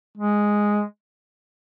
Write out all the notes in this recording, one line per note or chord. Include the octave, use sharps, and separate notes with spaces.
G#3